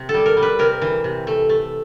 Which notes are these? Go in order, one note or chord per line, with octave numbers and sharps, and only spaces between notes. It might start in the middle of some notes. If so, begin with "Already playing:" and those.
Already playing: C3
A4
G3
A#4
G3
B4
C3 A#4
E3
C3
A3
A3